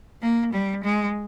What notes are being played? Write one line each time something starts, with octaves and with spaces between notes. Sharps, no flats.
A#3
G3
G#3